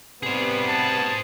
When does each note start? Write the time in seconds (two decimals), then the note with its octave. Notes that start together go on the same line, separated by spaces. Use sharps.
0.23 C3 G3 B3 G#4 C5
0.69 A5